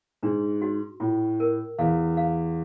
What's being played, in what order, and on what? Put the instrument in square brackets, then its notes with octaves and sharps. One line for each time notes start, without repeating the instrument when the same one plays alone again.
[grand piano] G#2 [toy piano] D4
[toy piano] F#4
[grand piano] A2 [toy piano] F4
[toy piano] A#4
[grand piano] E2 [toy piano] F5
[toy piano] F5